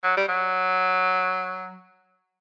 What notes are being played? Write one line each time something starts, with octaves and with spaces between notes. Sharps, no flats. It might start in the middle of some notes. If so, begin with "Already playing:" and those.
F#3
G3
F#3